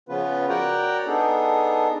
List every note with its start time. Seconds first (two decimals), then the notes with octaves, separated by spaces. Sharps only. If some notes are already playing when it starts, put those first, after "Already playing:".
0.09 C#3 F3 B3 C#4 F4 B4
0.49 F#4 A#4 C#5 D5 F#5 G5
1.06 B3 D4 D#4 G#4 A4